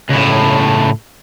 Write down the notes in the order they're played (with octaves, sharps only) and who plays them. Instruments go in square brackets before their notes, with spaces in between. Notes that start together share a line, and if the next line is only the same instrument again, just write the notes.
[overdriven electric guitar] C#2 A2